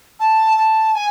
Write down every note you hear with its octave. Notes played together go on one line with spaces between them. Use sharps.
A5
A5
G#5